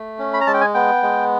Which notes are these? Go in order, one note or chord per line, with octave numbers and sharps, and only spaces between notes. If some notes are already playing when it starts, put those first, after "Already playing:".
Already playing: A3
C#4
B5
A#5
G#3 A5
G5
G#5
B3 G5
G#3